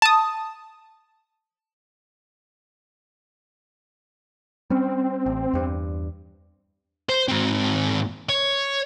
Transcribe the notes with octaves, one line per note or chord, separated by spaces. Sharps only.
A5 D#6
G3 C4 C#4
A1
E2 G2
C5
G#2 C4
C#5